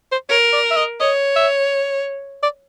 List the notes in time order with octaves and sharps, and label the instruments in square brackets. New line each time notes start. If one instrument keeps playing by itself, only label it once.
[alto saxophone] C5
[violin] A#4 [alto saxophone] C#5
[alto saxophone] D5
E5
D#5
[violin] C#5 [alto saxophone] D#5
[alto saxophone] E5
D5